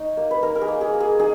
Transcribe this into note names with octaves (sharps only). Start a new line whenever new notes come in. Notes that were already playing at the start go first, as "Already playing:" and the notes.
Already playing: D#4 C#5 D#5
A#3
B4
D#4 A#4
A#4
G#4
A#3
G#4
A#3
G#4
D#4 G#4